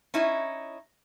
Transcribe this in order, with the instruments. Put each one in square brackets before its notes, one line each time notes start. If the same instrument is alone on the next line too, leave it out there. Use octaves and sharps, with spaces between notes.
[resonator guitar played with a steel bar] C#4 D#4 E4